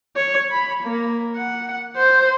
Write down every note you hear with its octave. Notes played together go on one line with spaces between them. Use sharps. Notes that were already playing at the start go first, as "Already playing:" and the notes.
C#5
B5
A#3
F#5
C5